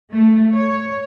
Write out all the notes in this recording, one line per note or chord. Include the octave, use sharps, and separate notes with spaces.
A3
C#5